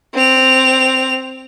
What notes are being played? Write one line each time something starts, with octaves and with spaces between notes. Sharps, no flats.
C4 F7